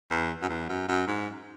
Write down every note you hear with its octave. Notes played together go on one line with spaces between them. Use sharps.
E2
F#2
E2
F#2
F#2
G#2